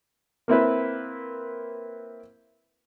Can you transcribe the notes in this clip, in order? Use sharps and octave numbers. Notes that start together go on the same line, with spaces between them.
A#3 C4 E4 B4